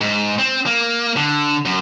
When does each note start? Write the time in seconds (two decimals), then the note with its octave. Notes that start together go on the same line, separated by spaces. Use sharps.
0.01 G#2
0.38 C4
0.66 A#3
1.17 D3
1.65 F#2